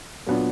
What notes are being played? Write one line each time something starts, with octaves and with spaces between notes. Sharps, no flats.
A#2 F#3 B3 D4